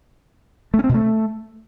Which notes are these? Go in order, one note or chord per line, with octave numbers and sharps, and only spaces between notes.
A3
C#4
C4
B2
A3